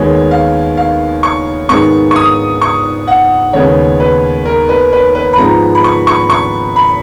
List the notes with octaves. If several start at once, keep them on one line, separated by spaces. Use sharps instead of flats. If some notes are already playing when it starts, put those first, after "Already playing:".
Already playing: D#2 D#3 G#3 B3 C#5
F5
F5
C#6
G#2 D#3 G#3 B3 C#6
C#6
D#6
C#6
F#5
D#2 C#3 G#3 B3 C#5
B4
A#4
B4
B4
B4
B5
G#2 F3 G#3 B3 A#5
B5
C#6
C#6
C#6
B5